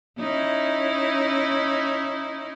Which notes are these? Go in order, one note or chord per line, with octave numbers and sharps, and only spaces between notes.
C#4 D#4 E4